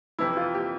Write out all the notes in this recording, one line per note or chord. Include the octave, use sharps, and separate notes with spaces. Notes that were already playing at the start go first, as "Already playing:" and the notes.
F2 C3 E3 E4
F4
G4